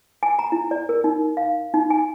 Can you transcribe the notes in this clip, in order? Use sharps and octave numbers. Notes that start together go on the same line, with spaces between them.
G#5
A#5
E4
D5
A#4
D#4
F5
D#4
G#5